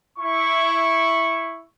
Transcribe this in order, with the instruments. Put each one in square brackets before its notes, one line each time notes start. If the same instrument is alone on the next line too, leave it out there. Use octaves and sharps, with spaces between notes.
[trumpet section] E4 C#6